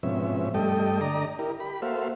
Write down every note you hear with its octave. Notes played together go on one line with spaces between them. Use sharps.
G#2 B2 F3 C4 C#4 E5
G2 G3 A3 A4 D#5 G5
D3 D5 D#5 A#5
E4 G4 A#4
G4 B5
A#3 F#4 A4 C5 E5 F5